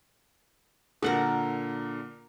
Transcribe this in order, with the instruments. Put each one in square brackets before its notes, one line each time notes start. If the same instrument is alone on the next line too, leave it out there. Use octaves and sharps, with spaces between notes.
[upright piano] A#2 D3 [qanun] A#4 F#5 A5